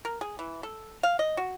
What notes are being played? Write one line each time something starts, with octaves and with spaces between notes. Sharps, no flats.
A#4
G#4
E3
A4
F5
D#5
F#4